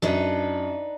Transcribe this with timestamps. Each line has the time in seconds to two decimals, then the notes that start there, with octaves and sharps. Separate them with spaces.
0.02 F#2 D4 D#4 B4